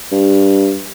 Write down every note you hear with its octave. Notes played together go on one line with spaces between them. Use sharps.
G2